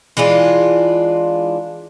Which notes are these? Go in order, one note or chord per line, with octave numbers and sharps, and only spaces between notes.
E3 G#3 D4 F4